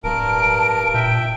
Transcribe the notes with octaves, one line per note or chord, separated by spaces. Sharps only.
D1 G2 A#4 A5 D7
A#2 E5 G5